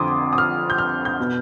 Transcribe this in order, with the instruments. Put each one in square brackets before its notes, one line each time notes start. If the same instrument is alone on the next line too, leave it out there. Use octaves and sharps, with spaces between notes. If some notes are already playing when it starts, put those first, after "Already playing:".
Already playing: [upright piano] F2 D3 F3 C6 D6 D#6
D#6
F6
G6
F6
G6
B2